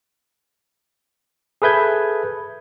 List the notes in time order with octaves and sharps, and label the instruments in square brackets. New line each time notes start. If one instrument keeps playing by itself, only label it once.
[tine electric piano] G#4 A4 B4 E5 G6 G#6